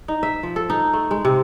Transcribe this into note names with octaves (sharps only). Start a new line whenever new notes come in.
D#4
E5
F3
A4
D#4
A3
G#3
C3